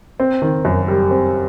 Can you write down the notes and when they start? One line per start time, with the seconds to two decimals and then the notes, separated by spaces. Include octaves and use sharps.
0.20 C4
0.42 D#3
0.65 F#2
0.88 G3
1.11 C4